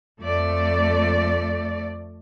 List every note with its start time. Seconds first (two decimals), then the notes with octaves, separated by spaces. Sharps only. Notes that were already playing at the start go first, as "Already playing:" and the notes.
0.19 F2 A3 D5